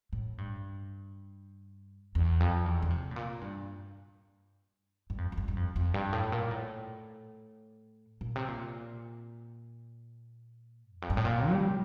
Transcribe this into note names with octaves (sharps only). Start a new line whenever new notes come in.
A2
G2
E2
F2
E2
D3
C3
A2
A#2
G2
G2
F2
F2
G2
G2
F2
F2
G2
A2
A#2
A2
A#2
C3
A#2
E2
F2
G2
A2
A#2
G3